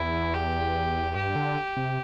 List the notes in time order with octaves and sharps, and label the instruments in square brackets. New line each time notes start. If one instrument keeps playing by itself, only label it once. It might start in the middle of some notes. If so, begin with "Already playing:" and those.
Already playing: [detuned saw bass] E2 [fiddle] E4
[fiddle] G4
[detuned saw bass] G2 [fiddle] G4
[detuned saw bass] D3
C3